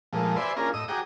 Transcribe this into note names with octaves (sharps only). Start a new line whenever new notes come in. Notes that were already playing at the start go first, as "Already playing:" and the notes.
A#2 F3 G#3 A3
B4 C5 D5 E5 G#5 C6
A#3 C#4 D4 F4 G#4 A#4
A2 D#5 D#6 E6
F#4 G#4 G5 A#5 D6 D#6